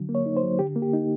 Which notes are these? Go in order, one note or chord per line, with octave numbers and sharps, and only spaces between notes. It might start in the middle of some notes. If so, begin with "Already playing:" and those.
Already playing: D3 F#3
A#3
C#5
D#4
C5
F#3
D3 G4
A#3
G4
D#4